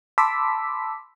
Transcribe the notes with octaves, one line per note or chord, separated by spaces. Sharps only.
A5 B5 C6 D6 E6 B6